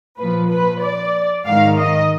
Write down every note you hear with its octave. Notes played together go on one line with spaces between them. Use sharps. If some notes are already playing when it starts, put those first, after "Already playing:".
A#2 F3 B4
B4
D5
G#2 D#3 F5
D#5